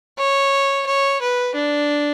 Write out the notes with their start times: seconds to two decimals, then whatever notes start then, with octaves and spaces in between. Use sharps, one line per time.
0.19 C#5
0.87 C#5
1.21 B4
1.55 D4